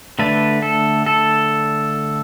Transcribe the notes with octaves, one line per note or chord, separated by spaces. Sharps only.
D3 A3 D4 B4
A4
A4